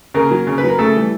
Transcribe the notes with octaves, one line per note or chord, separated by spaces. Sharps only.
C#3 A#3 A#4
F#3
C#3
B4
F#3 A#4
C#3 A3 A4
E3 G3